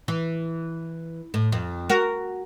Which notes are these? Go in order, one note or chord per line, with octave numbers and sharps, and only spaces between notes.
E3
A2
F2
F#4 A#4